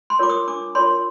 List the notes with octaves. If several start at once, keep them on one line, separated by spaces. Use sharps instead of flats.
C6
F4 A#4 C#5 D6
D#6
D4 D6
F4 A#4 C#5 C6